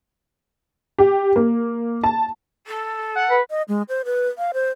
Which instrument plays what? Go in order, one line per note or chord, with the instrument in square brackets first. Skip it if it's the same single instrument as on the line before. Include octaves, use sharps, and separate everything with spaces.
[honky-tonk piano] G4
A#3
A5
[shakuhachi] A4
[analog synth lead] F#5
[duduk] B4
[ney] D#5
G#3
C5
B4
F5
C5